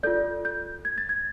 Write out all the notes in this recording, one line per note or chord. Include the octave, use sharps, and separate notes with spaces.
F4 A4 D5 G6
G6
G#6
A6
G#6